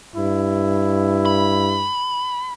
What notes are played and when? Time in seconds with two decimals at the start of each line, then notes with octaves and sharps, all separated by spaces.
0.16 G2 E4
1.26 B5